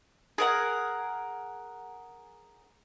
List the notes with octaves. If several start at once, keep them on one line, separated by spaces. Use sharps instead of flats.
G#4 A#4 F#5